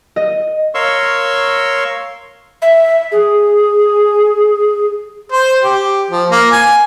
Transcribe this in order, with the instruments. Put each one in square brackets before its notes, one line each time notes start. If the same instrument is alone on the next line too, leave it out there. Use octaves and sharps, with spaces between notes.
[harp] D#5
[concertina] A#4 C#5 F5 C6 C#6 E6
[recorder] E5
G#4
[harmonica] C5
G4
F3
A#3
G#5